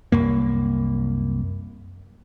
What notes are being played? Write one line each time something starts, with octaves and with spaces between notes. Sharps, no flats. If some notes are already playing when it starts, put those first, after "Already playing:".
C2 F#2 A#3